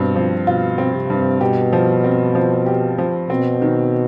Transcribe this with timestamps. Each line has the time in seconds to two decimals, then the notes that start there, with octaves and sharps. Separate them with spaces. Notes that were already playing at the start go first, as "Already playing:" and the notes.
Already playing: G2 B2 C4
0.16 F3
0.46 B2 F4
0.78 C4
0.94 C3
1.10 G2
1.41 B2 G4
1.73 F3
2.04 C4
2.35 F3
2.66 G4
2.98 F3
3.30 B2 C4
3.62 D#3